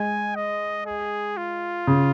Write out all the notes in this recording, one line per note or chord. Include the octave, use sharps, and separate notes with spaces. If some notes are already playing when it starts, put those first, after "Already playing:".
Already playing: G#3 G#5
D#5
G#4
F4
C#3